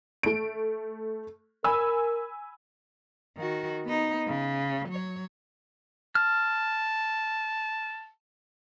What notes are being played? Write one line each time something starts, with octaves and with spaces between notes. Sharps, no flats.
A3 D7
A#4 G#5 B5 E6
D#3 F#4
B3 D#4
C#3
F#3 C#5
A5 F6